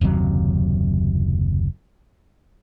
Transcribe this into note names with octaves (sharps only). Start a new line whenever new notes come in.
F#1 D#2 C3 F#3